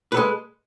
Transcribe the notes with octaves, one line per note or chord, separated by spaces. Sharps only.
G#3 A4 B4